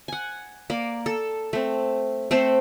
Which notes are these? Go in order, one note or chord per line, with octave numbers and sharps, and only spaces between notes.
F#5 G#5
A#3 D5
A4
A3 C4
A3 C4 A4 C5